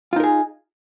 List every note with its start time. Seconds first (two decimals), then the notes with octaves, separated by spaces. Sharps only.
0.13 F4
0.16 D#4
0.20 A#4
0.23 G#4